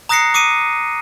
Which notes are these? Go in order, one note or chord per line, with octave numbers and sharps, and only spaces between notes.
A#5 D#6 F#6 A#6 C7 C#7
D6 D#6 C#7 D#7